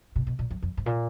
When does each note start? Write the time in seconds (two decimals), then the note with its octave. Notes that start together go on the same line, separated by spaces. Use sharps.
0.16 B2
0.27 B2
0.39 A#2
0.50 F#2
0.62 F2
0.77 G#2
0.86 A#2